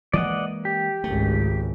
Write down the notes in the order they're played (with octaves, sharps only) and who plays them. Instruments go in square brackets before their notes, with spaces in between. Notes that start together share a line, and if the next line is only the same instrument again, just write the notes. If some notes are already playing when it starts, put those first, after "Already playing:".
[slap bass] E3 G#3 A#3 [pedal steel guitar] D5 D#5 F#5
[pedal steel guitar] G4
[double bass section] G#1 C#2 G#2 [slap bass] A3